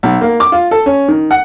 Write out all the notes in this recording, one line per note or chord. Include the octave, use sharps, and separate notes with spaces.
B1
A#3
D6
F4
A4
C#4
D#3
F#5